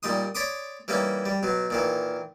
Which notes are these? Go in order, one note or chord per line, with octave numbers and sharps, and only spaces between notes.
A#2 G3 D#4 C6 D#6
C#5 D5 B5 C6 D6 D#6
E3 G3 A#3 C#4 D#4
G3
B2 F#3
A#2 D#3 E3